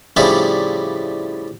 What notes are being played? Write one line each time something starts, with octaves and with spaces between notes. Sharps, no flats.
A2 C#3 F3 G3 D4 E4